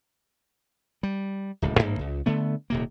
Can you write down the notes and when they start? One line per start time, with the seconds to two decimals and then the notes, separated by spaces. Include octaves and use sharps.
1.03 G3
1.62 D1 C#2
1.78 A1 G2 A#3
1.99 C#2
2.26 D3 A3 B3
2.70 D#1 C3 A#3